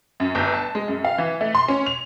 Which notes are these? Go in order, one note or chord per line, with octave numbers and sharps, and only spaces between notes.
F#2
G1
A5
G#3
F#2
F5
E3
A3
C6
C#4
F7